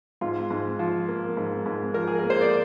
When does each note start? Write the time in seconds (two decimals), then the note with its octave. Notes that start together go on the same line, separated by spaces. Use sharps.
0.21 G#2 F4
0.50 G#2
0.79 F3 F4
1.08 A#3
1.37 G#2
1.66 G#2
1.94 F3 A#4
2.07 G#4
2.19 A#3 A#4
2.30 C5
2.41 D5